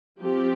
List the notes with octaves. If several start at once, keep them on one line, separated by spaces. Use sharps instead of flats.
F3 C4 G4